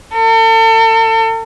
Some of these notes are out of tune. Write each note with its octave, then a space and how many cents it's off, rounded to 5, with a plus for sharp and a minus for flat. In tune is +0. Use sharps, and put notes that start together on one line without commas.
A4 +40